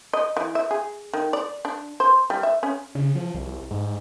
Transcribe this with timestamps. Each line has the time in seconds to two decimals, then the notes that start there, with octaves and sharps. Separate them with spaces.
0.13 D#5
0.37 E3
0.55 E5
0.71 G#4
1.14 D#3
1.33 D5
1.65 D4
2.00 C5
2.30 G3
2.43 E5
2.63 C#4
2.95 C#3
3.15 F3
3.35 C2
3.71 G#2